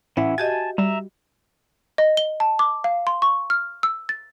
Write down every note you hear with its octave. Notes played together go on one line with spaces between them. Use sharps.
A2 E3 C#4 E4 E5 F#5
F#4 G4 D#5 G#5 A5 G#6
G3 E5 A#5
D#5
G7
A5
D6
F5
C6
C#6
F6
E6
A6